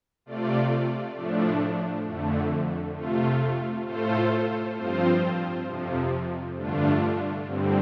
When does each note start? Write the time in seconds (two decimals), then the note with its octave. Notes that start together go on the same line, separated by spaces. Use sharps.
0.26 C3 A3 F4 D5
1.16 A2 F3 A3 D4
2.06 F2 D3 A3
2.96 C3 A3 F4
3.86 A2 A3 F4 A4 C5
4.77 G2 F3 C4 F4 C5
5.67 F2 C3 F3
6.57 G2 D3 A3 D4 F4
7.47 G2 D3 G3 C4